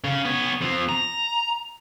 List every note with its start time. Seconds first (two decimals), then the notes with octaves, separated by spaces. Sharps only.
0.04 C#3 C#4
0.25 B3 C#5
0.62 F3 C4
0.89 A#5